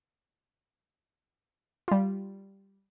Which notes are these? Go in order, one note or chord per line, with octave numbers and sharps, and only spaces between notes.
G3 F4